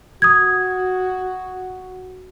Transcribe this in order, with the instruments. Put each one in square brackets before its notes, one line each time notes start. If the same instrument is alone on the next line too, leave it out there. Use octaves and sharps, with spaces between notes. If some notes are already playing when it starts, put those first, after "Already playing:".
[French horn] F#4 [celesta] D#6 G#6